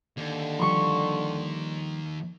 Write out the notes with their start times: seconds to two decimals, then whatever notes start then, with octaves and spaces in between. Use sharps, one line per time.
0.18 D#2 D3
0.59 F3 G3 C6 C#6